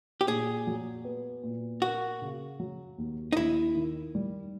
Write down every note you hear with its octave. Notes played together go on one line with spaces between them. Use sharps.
G4
A#2 G#4
F#3
B3
A#2
A#3 F#4
C#3
F#3
D#2
D#4
D#2 E4
D#3
G3